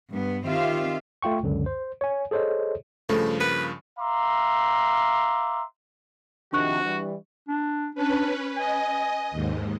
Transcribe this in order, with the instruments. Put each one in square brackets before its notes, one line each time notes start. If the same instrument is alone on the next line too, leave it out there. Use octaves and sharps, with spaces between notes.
[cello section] G2 B3
D#3 C4 F4 G4 E5 F5
[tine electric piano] A3 F4 G5 C#6
C#2 F#2 D3
C5
C#5 G#5
G#4 A4 C5 C#5 D#5
[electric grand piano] G2 C#3 F3 [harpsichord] A3
[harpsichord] A#3 [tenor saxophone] B4
[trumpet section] E5 F5 A#5 C6 D6
[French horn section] C3 D#3 F3 [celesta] D4 C#6 F#6 [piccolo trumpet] F#4
[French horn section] E3 G3
[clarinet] D4
[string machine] C#4 B4 [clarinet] D4
[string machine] D#5 [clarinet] G#5
[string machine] D#2 G#2